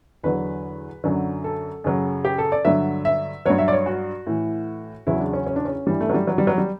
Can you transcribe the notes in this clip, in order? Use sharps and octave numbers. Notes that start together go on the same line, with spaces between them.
E2 D3 F#3 B4
F#2 D3 F#3
A4
F#2 C#3 F#3
G4
A4
D5
G2 D3 F#3 E5
E5
G2 F#3 C#5
E5
D5
C#5
F#4
A2 E3
E2 C#3 F#3 E4
D4
C#4
C#4
D4
C#4
G2 E3 G3
A3
F#3
G3
F#3
G3
F#3
G3